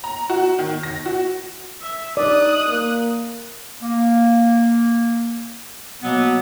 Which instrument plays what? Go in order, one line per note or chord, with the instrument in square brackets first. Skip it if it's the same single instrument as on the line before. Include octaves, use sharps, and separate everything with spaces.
[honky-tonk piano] A#5
F#4
D#3
A#6
F#4
[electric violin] E5
[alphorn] D#4 [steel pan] D5 [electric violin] D#6 F#6
[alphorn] A#3
[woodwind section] A#3
B2 F#3 A#3 B3